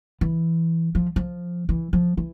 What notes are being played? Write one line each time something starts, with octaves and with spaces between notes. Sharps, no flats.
E3
F3
F3
E3
F3
E3